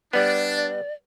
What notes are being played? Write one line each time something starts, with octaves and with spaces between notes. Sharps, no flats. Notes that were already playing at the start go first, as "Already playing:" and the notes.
G3 B3 D4 D5